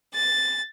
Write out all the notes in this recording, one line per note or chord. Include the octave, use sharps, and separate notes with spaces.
A6